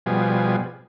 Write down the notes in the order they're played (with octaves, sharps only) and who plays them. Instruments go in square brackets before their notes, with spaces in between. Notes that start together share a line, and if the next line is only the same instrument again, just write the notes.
[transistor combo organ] B2 F3 G3 G#4